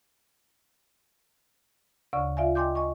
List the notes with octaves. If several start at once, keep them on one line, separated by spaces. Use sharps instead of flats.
D2 C#3 D5 C#6
F4 D5 E5 F5 G#5
D#5 G5 G#5 C6 D6 G6
D#5 G#5 C#6